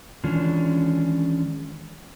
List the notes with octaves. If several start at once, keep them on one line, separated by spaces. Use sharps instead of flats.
D#3 E3 G#3 C#4 D4 F4